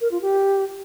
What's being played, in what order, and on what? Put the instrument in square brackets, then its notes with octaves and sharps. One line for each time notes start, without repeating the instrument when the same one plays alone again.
[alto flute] A#4
F4
G4